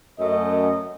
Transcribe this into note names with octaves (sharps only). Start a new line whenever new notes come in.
F#2 A3 D#5